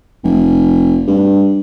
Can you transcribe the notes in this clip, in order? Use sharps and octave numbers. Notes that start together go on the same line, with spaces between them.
F1
G2